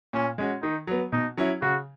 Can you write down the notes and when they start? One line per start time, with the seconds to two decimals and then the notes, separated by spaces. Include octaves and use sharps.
0.13 A#2 C#4
0.38 G#3 C#4 F#4
0.62 D#3 D#4
0.87 F#3 B3
1.12 B2 D#4
1.37 F#3 C#4 E4
1.62 C#3 F#4